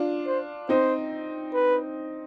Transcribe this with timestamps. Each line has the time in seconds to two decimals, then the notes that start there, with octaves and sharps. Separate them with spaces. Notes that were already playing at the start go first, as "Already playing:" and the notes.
Already playing: D4 F4
0.27 C5
0.69 C4 D#4 C5
1.54 B4